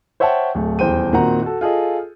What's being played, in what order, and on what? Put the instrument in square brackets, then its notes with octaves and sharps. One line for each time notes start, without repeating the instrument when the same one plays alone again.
[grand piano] C5 C#5 E5 F#5 G5 A5
D1 A3
D#1 E2 C5 G5 D#7
A#2 D#3 C4 F#4 F#5 A#5
F#4 A4
F4 G#4 A4 D#5